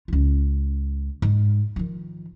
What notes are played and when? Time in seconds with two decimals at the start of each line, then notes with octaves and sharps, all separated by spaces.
0.08 C#2 F4
1.22 G#2
1.76 D#3 F3